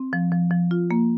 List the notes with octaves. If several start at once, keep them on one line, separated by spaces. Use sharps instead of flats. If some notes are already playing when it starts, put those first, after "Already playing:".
Already playing: C4
F3
F3
F3
F4
A#3